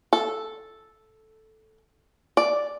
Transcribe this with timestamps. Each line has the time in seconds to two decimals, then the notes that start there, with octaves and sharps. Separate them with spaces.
0.13 A4
2.37 D5